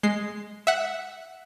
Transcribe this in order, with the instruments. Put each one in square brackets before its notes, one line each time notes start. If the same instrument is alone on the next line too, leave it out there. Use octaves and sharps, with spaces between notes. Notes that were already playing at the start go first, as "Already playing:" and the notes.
[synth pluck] G#3 C7
E5 F#5